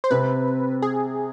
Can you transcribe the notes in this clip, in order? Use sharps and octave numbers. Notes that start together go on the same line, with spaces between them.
C5
C3 C4 B4
G#4